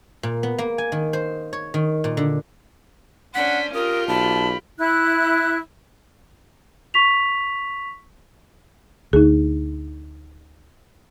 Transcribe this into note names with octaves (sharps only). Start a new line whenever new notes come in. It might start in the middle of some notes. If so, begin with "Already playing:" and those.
A#2
B3
A#3
G#5
D#3
C5
C#5
D#3
A#2
D3
C#4 D4 C5 F#5 B6
F4 G4 A#4 D#6
B1 A5 B5
E4 F#6
C#6 B6 F7
D2 D#4 G#4